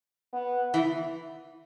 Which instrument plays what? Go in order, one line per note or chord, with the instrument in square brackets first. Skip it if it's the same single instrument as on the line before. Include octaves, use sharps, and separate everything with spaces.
[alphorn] B3
[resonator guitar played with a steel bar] E3